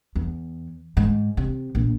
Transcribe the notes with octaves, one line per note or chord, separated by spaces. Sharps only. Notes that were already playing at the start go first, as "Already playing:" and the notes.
E2
G#2
C3
A#1